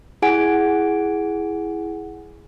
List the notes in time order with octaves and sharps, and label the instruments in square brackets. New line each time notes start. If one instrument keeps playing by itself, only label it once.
[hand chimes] E4 G#4 F#5 G#5 D7